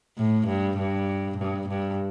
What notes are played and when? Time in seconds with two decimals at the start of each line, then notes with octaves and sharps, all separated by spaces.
0.18 A2
0.47 G2
0.78 G2
1.37 G2
1.68 G2